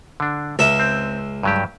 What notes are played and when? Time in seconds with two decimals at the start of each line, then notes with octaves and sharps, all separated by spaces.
0.20 D3 D4
0.59 C#2 E5
0.80 C4
1.43 G2 F#3 G4